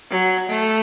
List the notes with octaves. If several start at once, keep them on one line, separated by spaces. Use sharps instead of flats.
F#3
A3